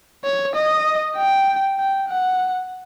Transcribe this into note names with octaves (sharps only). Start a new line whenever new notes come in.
C#5
D#5
G5
G5
F#5